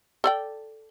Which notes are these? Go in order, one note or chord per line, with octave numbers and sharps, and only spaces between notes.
A4 D5 G5